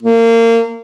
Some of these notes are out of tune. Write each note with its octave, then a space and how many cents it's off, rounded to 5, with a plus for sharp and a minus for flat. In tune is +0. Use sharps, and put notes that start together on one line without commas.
A#3 -30